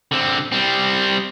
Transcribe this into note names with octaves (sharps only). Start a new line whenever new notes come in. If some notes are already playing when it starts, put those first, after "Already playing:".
D3 C4
G3 C4